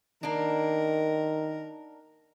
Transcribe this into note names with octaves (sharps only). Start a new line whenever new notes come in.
D#3 A#3 D4 A#4